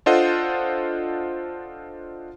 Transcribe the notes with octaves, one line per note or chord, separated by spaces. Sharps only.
D4 F4 A4 C5 D#5 F#5